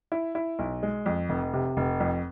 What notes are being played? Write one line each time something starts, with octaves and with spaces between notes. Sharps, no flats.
E4
E4
B1
G#3
F2
F1
C3
F1
F2